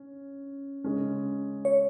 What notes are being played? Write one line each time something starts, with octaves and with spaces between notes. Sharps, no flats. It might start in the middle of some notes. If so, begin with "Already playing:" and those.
Already playing: C#4
C#3 G#3 C#4
C#5